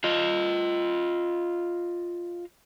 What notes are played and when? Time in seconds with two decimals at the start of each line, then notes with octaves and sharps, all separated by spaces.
0.04 F4 D#5